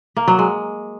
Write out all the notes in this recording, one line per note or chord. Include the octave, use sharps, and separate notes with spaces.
A#3
F#3
G#3